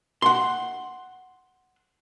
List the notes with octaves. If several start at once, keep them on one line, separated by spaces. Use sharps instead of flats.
F#5 C6